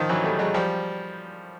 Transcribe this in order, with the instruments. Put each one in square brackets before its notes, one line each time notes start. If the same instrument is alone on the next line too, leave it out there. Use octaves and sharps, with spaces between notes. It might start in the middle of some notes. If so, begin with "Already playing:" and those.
Already playing: [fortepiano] D#3 F3
E3 F#3
G3 A3
F#3 G#3
F3 G3